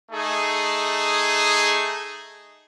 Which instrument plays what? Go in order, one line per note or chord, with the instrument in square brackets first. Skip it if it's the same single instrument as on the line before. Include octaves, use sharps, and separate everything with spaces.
[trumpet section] A3 D#4 G#4